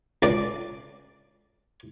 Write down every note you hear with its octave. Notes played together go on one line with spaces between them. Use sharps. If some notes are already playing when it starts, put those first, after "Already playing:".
C#2 D5